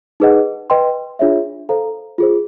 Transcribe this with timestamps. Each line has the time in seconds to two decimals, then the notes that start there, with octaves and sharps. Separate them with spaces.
0.20 D#4 G#4 B4 D#5 F#5
0.70 B4 D#5 G5 C6
1.19 D4 F4 G#4 C#5 E5
1.69 A4 C5 F5 A#5
2.18 F4 G#4 C5